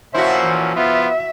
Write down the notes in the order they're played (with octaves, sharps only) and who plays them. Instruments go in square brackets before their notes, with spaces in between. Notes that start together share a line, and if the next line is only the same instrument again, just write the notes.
[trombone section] A#2 F3 C#4 [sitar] E4 F#4 [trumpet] C5 [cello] E5
[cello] E3
[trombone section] F3 F4 [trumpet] B3 [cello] E5